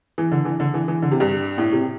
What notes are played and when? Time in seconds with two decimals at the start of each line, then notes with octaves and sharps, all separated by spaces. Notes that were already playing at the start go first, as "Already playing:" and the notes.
0.18 E3
0.32 D3
0.45 E3
0.60 D3
0.74 E3
0.88 E3
1.02 D3
1.11 C3
1.20 G2
1.58 A2
1.72 C3